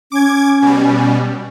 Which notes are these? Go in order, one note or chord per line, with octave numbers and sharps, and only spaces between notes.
C#4 D6 G#6
B2 G3